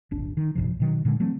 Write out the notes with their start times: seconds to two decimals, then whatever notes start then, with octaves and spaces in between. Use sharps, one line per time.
0.11 D1 G1 D4
0.37 D#3
0.55 A#1 G2 C3 F3
0.80 B2 D#3 F#3
1.05 A#2 D3 F#3 G#3
1.20 E3 F#3 A3 C4